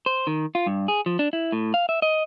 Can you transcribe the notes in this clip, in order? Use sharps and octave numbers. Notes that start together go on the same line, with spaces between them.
C5
D#3
F4
G2
G#4
F3
D4
E4
A2
F5
E5
D#5